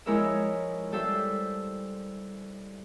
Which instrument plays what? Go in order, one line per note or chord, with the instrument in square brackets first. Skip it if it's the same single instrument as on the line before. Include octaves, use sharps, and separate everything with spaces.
[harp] F3 G#3 E4 A#4 C#5 E5
G3 A4 C5 E5